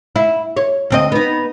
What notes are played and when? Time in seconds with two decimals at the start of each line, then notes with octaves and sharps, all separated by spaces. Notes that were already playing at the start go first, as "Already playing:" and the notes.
0.16 E4
0.57 C#5
0.90 D2 C4 D#5
1.12 B3 D#4